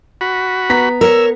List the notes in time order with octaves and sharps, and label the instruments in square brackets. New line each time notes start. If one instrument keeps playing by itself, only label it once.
[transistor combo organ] F#4 B5
[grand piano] B3 A#5 B6
[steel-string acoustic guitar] A#4 C#5 [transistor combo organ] E6